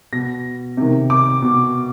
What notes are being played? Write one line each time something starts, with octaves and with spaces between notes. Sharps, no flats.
B2 A#6
C3 D#3
D6
B2